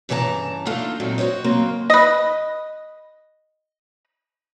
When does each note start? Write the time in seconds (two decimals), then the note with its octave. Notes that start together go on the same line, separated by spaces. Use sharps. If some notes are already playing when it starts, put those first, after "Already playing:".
0.09 G2 C#3 E3 C#5 A5 A#5
0.66 A3 A#3 D4 D#4 F4 A4
1.00 A#2 F#3 A3 C4 D#4
1.18 F#4 C5 C#5 D#5
1.44 C#3 F#3 A#3 C4
1.90 B4 D#5